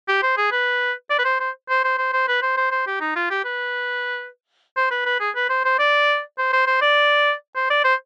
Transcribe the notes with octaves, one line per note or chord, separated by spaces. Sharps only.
G4
C5
G#4
B4
D5
B4
C5
C5
C5
C5
C5
C5
B4
C5
C5
C5
G4
D#4
F4
G4
B4
C5
B4
B4
G#4
B4
C5
C5
D5
C5
C5
C5
D5
C5
D5
C5